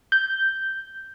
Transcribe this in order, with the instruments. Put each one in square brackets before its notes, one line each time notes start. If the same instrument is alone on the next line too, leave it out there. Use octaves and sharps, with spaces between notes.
[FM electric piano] G6